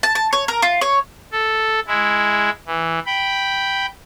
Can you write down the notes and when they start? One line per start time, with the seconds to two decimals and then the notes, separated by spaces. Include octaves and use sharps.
0.03 A5
0.15 A5
0.33 C#5
0.48 A#4
0.62 F4
0.81 C#5
1.32 A4
1.87 G#3 E4
2.67 E3
3.06 G5 B5